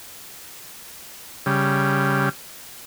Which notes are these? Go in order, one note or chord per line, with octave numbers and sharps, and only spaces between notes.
C#3 G3